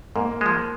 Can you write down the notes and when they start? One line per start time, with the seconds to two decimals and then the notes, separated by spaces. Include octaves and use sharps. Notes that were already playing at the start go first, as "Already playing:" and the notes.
0.16 G#2 A#3
0.41 F3 G#3